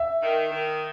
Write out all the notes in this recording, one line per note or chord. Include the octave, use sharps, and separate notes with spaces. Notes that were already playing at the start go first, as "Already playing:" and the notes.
Already playing: E5
D#3
D#3